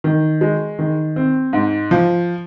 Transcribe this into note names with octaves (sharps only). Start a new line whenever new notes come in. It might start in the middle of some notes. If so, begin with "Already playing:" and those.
D#3
G#3
D#3
C4
G#2
F3